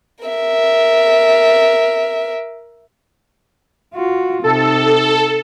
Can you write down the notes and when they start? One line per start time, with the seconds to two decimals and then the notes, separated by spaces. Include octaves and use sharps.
0.25 A#4 E5
3.94 F4 F#4
4.44 C3 D#4 A4